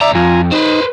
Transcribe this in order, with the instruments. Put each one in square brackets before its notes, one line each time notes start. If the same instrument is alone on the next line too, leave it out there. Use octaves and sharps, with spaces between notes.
[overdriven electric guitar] C#2 A#5 [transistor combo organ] D5 E5
[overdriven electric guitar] F2 [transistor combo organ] F4 G#5 A#5
[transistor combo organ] D#4 [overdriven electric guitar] B4 C5